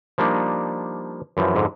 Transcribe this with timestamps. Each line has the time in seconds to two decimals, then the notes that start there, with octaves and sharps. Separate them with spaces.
0.18 F3 G3 A#3 D4 D#4
1.37 F#2 E3 F3
1.55 F2 G#2 D3